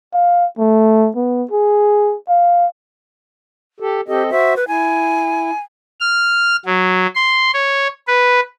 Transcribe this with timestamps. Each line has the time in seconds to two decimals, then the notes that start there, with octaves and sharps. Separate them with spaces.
0.14 F5
0.58 A3
1.16 B3
1.51 G#4
2.28 F5
3.80 G4 A4
4.08 C4 G4 A4 D#5
4.30 F#4 C5 E5
4.57 B4
4.68 E4 G#5
6.00 F6
6.65 F#3
7.15 C6
7.54 C#5
8.08 B4